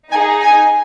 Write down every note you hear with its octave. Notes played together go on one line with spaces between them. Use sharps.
D#4 G#5
G#4
G#5